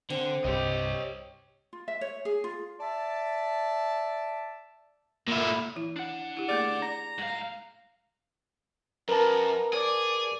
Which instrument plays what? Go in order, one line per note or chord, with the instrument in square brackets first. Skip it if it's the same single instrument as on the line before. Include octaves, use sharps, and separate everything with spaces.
[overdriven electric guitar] D3 [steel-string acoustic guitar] C4
[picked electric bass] C2 G2 [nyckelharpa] G4 [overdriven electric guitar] C#5 D#5
[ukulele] F4
E5
C#5
G#4
F4
[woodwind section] D5 E5 A5
[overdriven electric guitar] A#2 E4 [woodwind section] D3
[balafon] E3 E4
[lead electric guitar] D4 F#5
[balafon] E4 G4
[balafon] A3 A#3 G#4 [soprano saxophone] D5
[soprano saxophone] A#5
[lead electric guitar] G#2 F5
[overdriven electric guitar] F#2 [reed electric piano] A#4 B4 A5 [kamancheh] A#5
[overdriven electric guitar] G#4 [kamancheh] D5